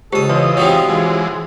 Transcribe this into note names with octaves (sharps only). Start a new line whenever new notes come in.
C#2 G4 A4 C5 D#6
E3 F4 B4 C#5 D#5
C3 F3 F#3 C#5 G5
E3 G#3